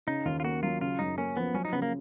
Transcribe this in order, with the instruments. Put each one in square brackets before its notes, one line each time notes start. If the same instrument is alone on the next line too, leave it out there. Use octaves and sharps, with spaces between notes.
[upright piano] C#3 [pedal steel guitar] D#4
[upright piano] D#2 [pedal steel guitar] F4
[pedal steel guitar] F4
[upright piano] A#3 [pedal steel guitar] F#4
[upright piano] F#3 [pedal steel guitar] F4
[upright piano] C#3 [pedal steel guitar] F4
[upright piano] F#2 [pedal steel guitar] D#4
[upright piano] A#3 [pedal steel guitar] C#4
[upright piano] F3 [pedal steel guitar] B3
[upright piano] F#3 [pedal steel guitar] C#4
[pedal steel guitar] D#4
[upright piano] C#3 [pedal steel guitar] B3
[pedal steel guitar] A#3